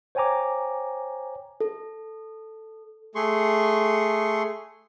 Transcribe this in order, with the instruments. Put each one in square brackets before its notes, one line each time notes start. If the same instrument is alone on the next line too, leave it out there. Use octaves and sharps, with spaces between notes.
[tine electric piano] C5 C#5 G5 G#5 A#5 D6
[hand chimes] A4
[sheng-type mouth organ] A3 G#4 C6 C#6